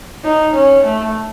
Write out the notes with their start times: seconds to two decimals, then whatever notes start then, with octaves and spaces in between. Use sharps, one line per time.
0.24 D#4
0.55 C#4
0.84 A3